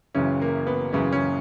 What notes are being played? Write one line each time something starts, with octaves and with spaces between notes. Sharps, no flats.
F#1 F#2 C#3 E3 C#4
A#3
B3
F#1 F#2 C#3 E3 C#4
C#3 C#4